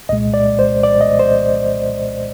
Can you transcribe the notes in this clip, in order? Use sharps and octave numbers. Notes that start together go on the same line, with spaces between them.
C2 A#2 G#3 D#5
D5
C5
D5
D#5
C5